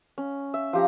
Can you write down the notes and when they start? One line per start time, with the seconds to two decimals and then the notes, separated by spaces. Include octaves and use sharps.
0.18 C#4
0.54 E5
0.73 F3 G4 A#5